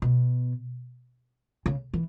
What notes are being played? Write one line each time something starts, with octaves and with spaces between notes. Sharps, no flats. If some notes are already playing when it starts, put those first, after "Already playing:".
B2
C#3
E3